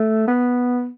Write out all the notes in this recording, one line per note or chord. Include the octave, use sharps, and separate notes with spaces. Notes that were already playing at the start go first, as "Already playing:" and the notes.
Already playing: A3
B3